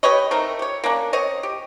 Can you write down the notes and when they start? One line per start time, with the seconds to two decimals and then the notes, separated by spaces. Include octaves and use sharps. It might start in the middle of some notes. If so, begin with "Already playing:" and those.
0.03 G4 B4 C#5 D#5
0.31 A3 C4 D#4 A#4
0.59 G4 C#5
0.84 A#3 C#4 D4
1.13 C4 C#5 D#5
1.43 G4